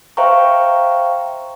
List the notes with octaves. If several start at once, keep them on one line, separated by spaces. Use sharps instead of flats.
C5 E5 F5 G5 A#5 C#6